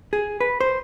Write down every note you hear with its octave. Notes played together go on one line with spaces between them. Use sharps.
G#4
B4
C5